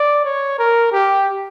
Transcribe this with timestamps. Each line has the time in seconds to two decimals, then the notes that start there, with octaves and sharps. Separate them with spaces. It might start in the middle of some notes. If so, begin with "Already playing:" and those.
Already playing: D5
0.24 C#5
0.59 A#4
0.92 G4